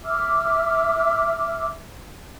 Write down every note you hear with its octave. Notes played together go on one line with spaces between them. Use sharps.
E5 D6 E6 F6